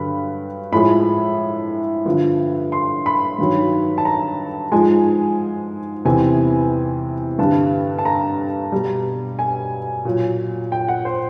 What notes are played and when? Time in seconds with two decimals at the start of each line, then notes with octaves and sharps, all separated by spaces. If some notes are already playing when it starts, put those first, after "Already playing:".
Already playing: G2 D3 F#3 B5
0.72 A2 F3 G#3 B5
2.06 G2 D3 F3
2.72 C6
3.06 B5
3.39 G2 D#3 F#3
3.98 A5
4.05 A#5
4.72 G#2 F3 G#3 G#5
6.05 E2 C3 E3 G#5
7.39 G2 D3 G3 A5
7.99 A5
8.05 A#5
8.72 B2 G3
9.39 G#5
10.05 A#2 F#3
10.72 G5
10.88 F#5
11.05 C5